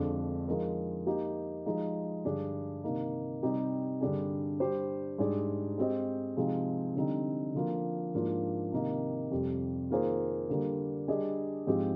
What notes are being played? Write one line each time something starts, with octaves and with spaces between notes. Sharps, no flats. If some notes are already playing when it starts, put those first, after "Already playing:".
Already playing: F2 D3 G#3 D4
F3 G#3 D#4 A#4
A#3 D#4 G4
F3 G#3 D#4
G2 D3 G3 D4 G#4
C3 D#3 A#3 D#4
C3 G3 C4 D#4 G4
G2 D3 G3 D4 G#4
G3 D4 G4 C5
G#2 G3 D4 G#4 D5
G#3 C4 G4 C5 D#5
C3 F3 G#3 C4 D#4
D3 G3 C4 D#4
D3 F3 A#3 F4
G#2 F3 A#3 D4 F4
C3 D#3 A#3 D#4
F2 C3 G3
D#3 A#3 F4 G#4 C5
D3 G3 A#3
G3 D4 G#4 D#5
G#2 F3 G#3 C4 G4